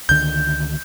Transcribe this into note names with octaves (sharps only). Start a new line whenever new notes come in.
C#2 D3 D#3 G6